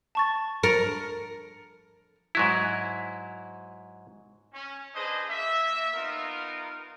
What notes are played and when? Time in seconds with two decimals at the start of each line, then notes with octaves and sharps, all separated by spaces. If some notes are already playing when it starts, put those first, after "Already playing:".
0.15 A5 C#6 A6
0.63 A#4 A6 C#7
2.35 G#2 F#3 E4
4.53 C#4
4.94 D4 G#4 B4 C5 D#5
5.28 A#3 E5
5.93 B3 D#4 F4 A#4